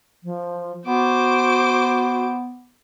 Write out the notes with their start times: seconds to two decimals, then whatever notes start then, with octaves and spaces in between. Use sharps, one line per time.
0.24 F3
0.87 B3 F#4 C5 D6